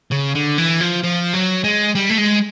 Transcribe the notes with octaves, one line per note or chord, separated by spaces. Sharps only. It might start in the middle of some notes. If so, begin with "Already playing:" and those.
C#3
D3
E3
F3
F3
F#3
G#3
G3
A3
G#3